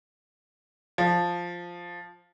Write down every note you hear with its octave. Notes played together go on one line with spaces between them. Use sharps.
F3